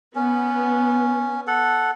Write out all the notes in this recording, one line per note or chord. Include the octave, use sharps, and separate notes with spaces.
B3 C#4
A4 F#5